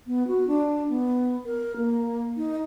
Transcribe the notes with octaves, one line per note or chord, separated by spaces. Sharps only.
B3
F#4
D4
B3
A#4
A#3
D#4